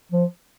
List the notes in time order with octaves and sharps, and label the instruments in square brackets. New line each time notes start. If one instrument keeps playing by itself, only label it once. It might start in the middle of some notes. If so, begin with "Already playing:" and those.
[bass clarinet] F3